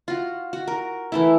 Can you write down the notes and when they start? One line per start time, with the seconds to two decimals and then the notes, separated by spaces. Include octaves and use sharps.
0.08 F4 F#4
0.53 F#4
0.67 A#4
1.12 E3 A3 E4